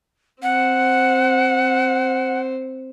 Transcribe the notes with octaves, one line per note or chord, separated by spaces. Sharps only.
C4 C5 F#5